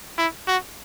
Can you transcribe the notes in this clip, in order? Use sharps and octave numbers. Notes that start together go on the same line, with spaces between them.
E4
F#4